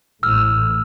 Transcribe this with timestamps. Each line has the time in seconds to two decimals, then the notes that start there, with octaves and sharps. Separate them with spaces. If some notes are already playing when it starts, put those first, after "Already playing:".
0.23 A1 A2 E6 F6